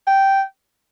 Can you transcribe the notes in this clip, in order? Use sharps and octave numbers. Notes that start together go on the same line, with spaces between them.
G5